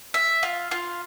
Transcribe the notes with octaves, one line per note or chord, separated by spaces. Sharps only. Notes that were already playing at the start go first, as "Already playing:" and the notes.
E5
F4
F4